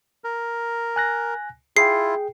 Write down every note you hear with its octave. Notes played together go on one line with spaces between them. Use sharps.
A#4
G#5 F#6 A#6
E4 F4 G#4 G5 C7